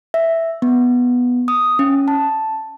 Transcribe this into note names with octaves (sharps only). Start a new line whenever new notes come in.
E5
B3
D#6
C#4
A5